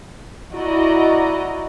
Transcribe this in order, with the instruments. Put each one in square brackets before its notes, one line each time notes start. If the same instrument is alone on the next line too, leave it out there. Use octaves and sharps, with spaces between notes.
[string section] E4 F#4 D5 D#5 A#5